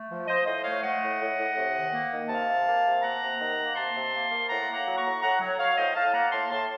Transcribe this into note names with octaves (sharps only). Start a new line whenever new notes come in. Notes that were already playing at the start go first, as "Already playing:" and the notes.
Already playing: A3
F3
F3 C5 D#5
A2 C5 D#5
A3 C#5 F5
A3 D#5 F#5
A2
A2
A2
C3
D#3
A#3
D#3
C3 F5 A5
C3
A#3
C3
A#3 F#5 A#5
C3
D#3
A#3
C3 A5 C6
C3
A#3
A#3
A2 F#5 A#5
A#3
F#5 A#5
F#3
A#5 C#6
A2
A2 F#5 A#5
F#3
F#3 C#5 F5
A2 C5 D#5
A2 F5 A5
A#3 F#5 A#5
A2 A5 C6
A2 A5 C6